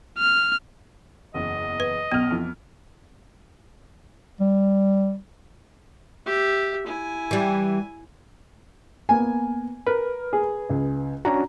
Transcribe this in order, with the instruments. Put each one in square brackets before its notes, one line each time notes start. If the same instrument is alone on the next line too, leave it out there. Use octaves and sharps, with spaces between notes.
[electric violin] F6
[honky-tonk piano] F#1 E2 [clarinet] D#5
[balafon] B4
[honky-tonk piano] B1 F6 [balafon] B3
[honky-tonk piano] F2 E3
[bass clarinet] G3
[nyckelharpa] G4 E5
E4 G#5
[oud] E3 G3
[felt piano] A#3 B3 [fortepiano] G#5
[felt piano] A#4 [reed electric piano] B4
[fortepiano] G#4
[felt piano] C#2
[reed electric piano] C#4 D4 F#4 [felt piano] A#5